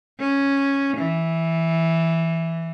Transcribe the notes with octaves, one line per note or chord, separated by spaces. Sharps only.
C#4
E3